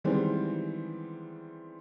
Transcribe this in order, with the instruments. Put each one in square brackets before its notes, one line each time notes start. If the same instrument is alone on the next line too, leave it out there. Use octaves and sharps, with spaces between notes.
[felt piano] D#3 E3 G3 G#3 B3 C4